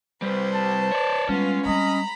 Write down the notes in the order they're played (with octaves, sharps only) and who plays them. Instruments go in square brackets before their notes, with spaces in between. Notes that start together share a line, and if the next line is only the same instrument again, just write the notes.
[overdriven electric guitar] C2 G3 [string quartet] B4 C5
[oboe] A5
[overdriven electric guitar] C#5 D5
[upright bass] G3 [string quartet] G#3 B3 F4 [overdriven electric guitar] C#4
[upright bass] G3 C4 [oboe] D#5 [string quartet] A#5 B5